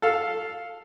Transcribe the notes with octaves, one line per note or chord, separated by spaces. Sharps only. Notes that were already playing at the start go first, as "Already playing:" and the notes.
A4 F5